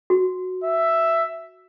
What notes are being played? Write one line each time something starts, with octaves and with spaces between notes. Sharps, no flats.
F#4
E5